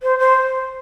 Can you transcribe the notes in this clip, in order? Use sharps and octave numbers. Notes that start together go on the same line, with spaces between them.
C5
C5